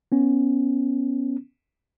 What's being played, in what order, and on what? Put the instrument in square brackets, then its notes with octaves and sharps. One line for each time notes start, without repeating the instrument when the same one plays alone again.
[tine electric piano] B3 C#4